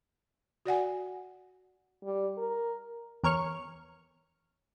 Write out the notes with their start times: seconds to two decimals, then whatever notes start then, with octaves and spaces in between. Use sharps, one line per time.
0.65 F#4 D5 F#5 G#5
2.04 G3
2.38 A#4
3.24 E2 A#4 C#5 F6 C#7